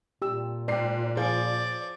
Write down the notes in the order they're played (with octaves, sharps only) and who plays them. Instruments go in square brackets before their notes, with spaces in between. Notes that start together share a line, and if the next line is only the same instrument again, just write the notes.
[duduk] A#2 [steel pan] G4 E6
[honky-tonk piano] G#2 C7 [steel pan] D5 G5
[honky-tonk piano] F3 [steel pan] G#4 F5 [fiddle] D5